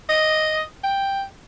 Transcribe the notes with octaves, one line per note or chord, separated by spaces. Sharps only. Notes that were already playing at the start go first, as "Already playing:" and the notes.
D#5
G5